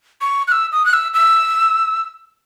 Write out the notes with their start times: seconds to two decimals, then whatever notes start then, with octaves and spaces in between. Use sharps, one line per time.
0.21 C#6
0.48 F#6
0.52 E6
0.72 D#6
0.85 F#6
0.93 E6
1.14 E6